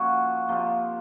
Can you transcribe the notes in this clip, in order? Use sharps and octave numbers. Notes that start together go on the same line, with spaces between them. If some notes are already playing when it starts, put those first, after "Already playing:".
Already playing: F3 A#3 C#4 F#4
C3 F3 A#3